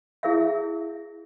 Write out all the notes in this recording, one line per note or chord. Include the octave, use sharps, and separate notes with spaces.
E4 G#4 A#4 E5 F5